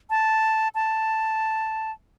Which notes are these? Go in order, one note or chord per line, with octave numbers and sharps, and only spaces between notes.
A5
A5